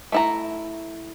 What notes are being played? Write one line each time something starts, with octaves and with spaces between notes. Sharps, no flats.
A3 E4 A#5